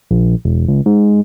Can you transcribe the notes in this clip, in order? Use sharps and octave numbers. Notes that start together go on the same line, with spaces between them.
A#1
E1
C#2
G#2